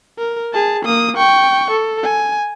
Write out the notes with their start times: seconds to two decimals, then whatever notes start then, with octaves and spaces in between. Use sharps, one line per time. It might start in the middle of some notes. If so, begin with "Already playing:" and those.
0.19 A#4
0.53 G#4 A5
0.85 A#3 D#6
1.17 G5 C#6
1.71 A4
2.03 G#5